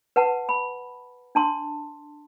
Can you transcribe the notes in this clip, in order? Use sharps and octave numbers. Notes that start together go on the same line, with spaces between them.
B4 F#5 A5
B5
D4 A5 C6